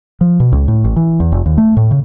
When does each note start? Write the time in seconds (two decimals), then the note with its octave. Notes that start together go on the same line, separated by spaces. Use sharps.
0.21 F3
0.40 B2
0.52 C#2
0.68 A2
0.84 A1
0.96 E3
1.20 E2
1.32 F1
1.46 D#2
1.58 A3
1.77 A2
1.91 C#3